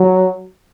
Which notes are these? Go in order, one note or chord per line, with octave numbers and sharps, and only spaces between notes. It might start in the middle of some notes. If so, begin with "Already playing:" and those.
Already playing: F#3